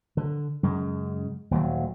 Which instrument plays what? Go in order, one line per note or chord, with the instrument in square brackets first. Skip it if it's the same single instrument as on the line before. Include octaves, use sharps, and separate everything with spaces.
[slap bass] D3
F#2 C#3 G#3
D#1 D#2 D3 F#3